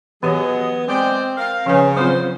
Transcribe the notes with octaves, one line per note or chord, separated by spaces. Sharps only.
E3 F#3 B3 G4 G#4 C#5 D#5
G#3 C4 D5 G5
A#4 F5
C#3 F3 C#4 B4
F#3 C4 F4 C5